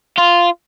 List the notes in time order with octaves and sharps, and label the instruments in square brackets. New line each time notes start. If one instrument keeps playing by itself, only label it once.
[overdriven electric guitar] F4